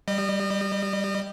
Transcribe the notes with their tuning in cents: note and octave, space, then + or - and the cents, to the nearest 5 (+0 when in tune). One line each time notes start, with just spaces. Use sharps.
G3 +0 D#5 -35